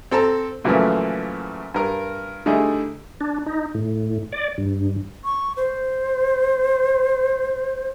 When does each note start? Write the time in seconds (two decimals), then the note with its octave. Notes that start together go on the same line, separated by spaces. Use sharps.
0.11 C4 A4 A5 A#5
0.64 F#2 A#2 C#3 E3 F3 A3
1.74 G2 A#4 F6
2.46 D3 G3 A3 D#4 E4 G#4
3.21 D4
3.46 D#4
3.75 A2
4.32 D5
4.58 G2
5.24 C#6
5.57 C5